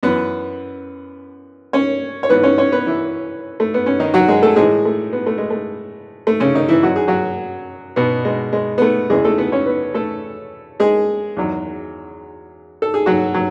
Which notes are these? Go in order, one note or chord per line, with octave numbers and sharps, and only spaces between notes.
F#2 E3 B3 B4
C#4 C#5
C#5
G#2 E3 B3 B4
C#4 C#5
C#4 C#5
B3 B4
E3 E4
A3
B3
C#4
D#3 D#4
F#3 F#4
G#3 G#4
A3 A4
A2 E3 G#3 G#4
A3
B3
A3
G#3
A3
A3
C#3 C#4
D#3 D#4
E3 E4
F#2 D#3 F#3 F#4
G#4
F#3 F#4
B2 B3
G#3
G#3
B3
A3
E2 C#3 E3 G#3 G#4
A3 A4
B3 B4
C#4 C#5
B3 B4
A3 A4
G#3 G#4
E2 D#3 F#3
A4
G#4
F#3 F#4
F#3